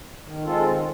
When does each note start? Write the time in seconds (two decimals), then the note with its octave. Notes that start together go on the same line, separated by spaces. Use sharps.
0.24 D#3
0.44 G#3 C4 F4 A4
0.64 D#3